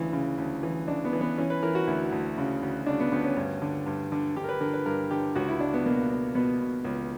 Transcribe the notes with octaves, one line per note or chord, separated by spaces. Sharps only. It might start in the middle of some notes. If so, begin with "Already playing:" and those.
Already playing: D2 C#3 E3
C#3
D2
E3
C#3 D4
B3
E3
B3
E3 C#4
B4
E3 A#4
F#4
D2 E4
D2
C#3
D2
C#3 D4
B3
D2 B3
C#4
G2
D3
G2
D3
D3 G4
A#4
B4
D3 A#4
B4
G2 A#4
D3 G4
C#2 F#4
E4
C#2 D4
B3
B2 A#3
B2
B2 B3
B2
C#2